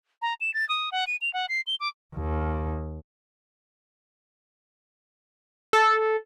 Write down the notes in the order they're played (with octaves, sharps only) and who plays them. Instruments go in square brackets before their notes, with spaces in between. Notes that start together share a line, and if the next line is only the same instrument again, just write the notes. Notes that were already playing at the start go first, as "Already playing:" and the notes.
[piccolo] A#5
E7
A6
D#6
F#5
D#7
F7
F#5
C7
G7
D6
[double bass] D#2
[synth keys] A4